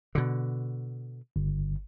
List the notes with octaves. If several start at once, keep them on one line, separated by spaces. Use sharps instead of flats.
B2 D3
G1